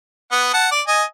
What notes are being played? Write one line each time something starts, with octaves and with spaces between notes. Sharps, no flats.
B3 F#5
F#5 A5
D5
D#5 G#5